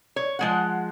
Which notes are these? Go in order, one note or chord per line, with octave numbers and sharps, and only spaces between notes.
C#5
F3 G#3 F#5